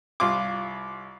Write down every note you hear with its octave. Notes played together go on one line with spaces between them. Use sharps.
C2 F4 C6 D6